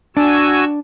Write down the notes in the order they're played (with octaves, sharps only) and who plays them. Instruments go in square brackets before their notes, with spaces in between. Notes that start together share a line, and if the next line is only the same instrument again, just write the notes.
[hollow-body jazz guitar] D4 [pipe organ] F#4 G#5 E6